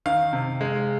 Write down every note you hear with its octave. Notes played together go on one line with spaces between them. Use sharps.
D#3 F5
C3
G#3